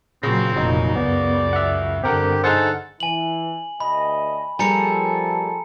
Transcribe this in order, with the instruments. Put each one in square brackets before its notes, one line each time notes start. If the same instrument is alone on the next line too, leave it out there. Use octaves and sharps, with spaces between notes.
[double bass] A#2 F#3 [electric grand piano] C#3 A#6 [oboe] C4
[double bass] F1 A#2 [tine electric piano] F#3 D#4
[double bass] C#2 F#2 [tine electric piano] B3 [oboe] D5
[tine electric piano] E5 F#5
[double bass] G2 D3 [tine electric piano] C4 A#4 F#5 [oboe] G4
[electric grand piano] D#4 G#4 C5 [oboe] A4 [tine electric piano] F#5 F6
[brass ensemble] E3 [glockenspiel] G#5 F#7
[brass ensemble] D2 D#5 [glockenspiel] B5
[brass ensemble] F3 A4 [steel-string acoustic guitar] G3 A#3 G#4 [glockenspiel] G#5 A#5 C#7